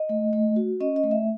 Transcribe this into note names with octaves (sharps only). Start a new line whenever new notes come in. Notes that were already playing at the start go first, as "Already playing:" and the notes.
Already playing: D#5
A3
A3
F#4
C#4 D#5
D#5
A3
E5